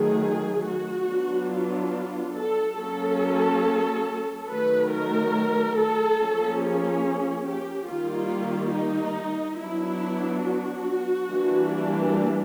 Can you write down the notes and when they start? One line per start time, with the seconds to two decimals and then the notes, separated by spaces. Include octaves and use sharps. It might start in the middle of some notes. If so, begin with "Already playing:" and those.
Already playing: D#3 F#3 A3 G#4
0.67 F#4
1.09 F#3 B3 D4
1.51 F4
2.37 A4
2.79 F#3 A#3 C#4 A4
4.49 D#3 F#3 A3 B4
4.92 A#4
5.77 A4
6.19 F3 A#3 C#4
6.62 G#4
7.47 G4
7.90 D#3 G3 A#3 F4
8.74 D#4
9.60 F#3 B3 D4 E4
10.45 F#4
11.30 E3 G3 A#3 D4